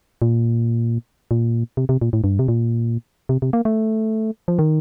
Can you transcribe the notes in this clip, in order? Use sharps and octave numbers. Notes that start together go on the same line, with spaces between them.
A#2
A#2
C3
C3
A#2
A2
G2
C3
A#2
C3
C3
A#3
A3
F3
D#3